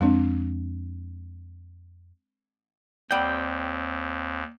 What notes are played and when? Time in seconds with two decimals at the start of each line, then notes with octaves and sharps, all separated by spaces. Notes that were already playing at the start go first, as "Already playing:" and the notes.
0.01 F2 G#3 C4 D4
3.11 D#2 G3 C4 F#5 G5